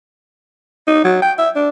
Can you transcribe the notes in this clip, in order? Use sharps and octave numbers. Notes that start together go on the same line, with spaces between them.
D#4
F#3
G5
E5
D4